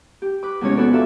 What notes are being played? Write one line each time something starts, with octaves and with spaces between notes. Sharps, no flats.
G4
B4 D6
E2 C3 G#3 C#4 C#5
B3 F#4 A4 B4 C#5 D5
F4 F#4 A4 E5 A5 D6